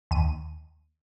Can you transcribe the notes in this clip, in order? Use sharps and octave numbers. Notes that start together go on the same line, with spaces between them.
D#2 D#7